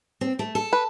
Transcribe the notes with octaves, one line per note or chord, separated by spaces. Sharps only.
C4
A3
A4
B4